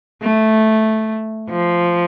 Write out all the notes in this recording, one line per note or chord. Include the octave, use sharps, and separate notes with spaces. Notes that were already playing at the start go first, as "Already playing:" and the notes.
A3
F3